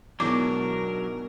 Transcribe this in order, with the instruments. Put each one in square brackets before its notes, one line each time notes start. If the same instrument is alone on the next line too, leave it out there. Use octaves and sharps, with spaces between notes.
[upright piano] G#2 B2 E3 [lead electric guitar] F#3 D4 [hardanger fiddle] A#4 [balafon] D6